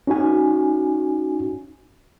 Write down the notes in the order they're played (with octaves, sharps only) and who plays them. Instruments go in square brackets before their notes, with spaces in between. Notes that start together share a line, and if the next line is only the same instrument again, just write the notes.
[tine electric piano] C#4 D#4 F#4 G#5